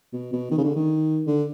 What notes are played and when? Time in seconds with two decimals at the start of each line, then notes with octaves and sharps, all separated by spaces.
0.12 B2
0.32 B2
0.51 D#3
0.58 C#3
0.64 D3
0.75 D#3
1.27 D3